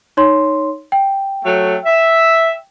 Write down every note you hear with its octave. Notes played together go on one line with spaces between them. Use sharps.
D#4 C#5 C6
G5
F#3 A3
E5